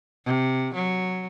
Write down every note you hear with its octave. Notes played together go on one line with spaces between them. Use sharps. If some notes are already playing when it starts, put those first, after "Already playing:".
C3
F#3